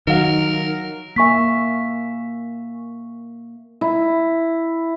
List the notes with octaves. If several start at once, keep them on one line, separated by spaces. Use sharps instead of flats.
D#3 F#3 A#4 F5 F#5
A#3 E5 G#5 C#6 B6
E4